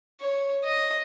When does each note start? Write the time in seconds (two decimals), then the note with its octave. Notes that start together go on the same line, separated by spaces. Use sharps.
0.20 C#5
0.64 D#5